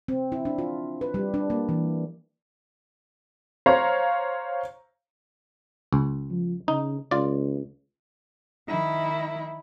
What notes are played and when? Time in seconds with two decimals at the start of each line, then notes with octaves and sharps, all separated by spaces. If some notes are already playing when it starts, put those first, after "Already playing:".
0.08 C4
0.32 E4
0.45 D4
0.58 F4
1.01 B4
1.14 G3
1.34 D4
1.50 A#3
1.69 E3
3.66 C5 C#5 F5 A#5
5.93 C#2
6.30 F3
6.68 C#3 D#4
7.11 C#2 F4 D5
8.68 D#3 E4